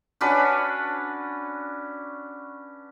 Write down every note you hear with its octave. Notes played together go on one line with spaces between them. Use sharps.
C#4 D4 F#4 B4